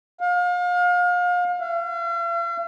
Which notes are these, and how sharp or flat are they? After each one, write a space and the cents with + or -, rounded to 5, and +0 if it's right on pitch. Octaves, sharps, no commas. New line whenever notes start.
F5 +35
F5 -45